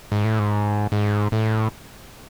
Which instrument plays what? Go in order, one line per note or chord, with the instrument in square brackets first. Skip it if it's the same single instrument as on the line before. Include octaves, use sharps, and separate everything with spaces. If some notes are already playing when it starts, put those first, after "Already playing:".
[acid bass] G#2
A2
G#2
G#2
A2